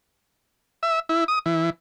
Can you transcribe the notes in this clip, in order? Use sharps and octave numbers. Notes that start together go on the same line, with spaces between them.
E5
E4
D#6
E3